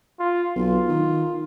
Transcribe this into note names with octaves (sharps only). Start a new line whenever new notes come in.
F4
B1 F4
D#3